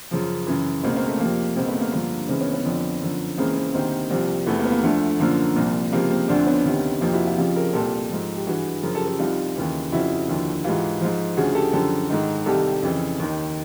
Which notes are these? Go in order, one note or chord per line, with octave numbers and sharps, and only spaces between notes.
F#2 C#3 F3
F#2 C#3 E3
C#2 B2 A#3 C4
A#3 C4
A3
F2 C3 F3 A#3
C#2 B2 A#3 C4
A3 B3
A#3
G2 D3 F3 A#3
C#2 C#3 E3 A#3 C4
B3 C#4
B3 C#4
F2 D3 F3
F#2 D3 F3
C#2 C#3 E3 A#3 C4
A#3 C4
D2 C3 D#3 A#3 C4
C2 C3 F3
E2 C3 E3 A3 B3
A#3
B3
A#3
D2 D3 F3 A3
F#2 D3 F3 A#3
C2 A#2 F3
C#2 C3 F3 A#3
A#3 C4
D2 D3 F3 C4 D4
B3 C#4
D2 C3 D#3
F2 C3 F3 A#3 C4
E4 F#4
F4 G4
F2 C#3 F3 F4 G4
G#4 A#4
C2 A#2 F3 G4 A4
G#2 F3
G4
G2 E3 F#4 G#4
F#2 C#3 F3 G#4 A#4
G4 A4
G4 A4
C2 C3 F3 D#4 F4
D#2 C#3 E3
F2 C#3 F3 E4 F#4
D#2 D3 F3
G#2 E3 F4 G4
G#2 F3
D2 C#3 F3 F#4 G#4
G4 A4
F#2 D3 F3 G4 A4
G#2 D#3
C2 C3 D#3 G4 A4
F2 C#3 E3
D#2 D#3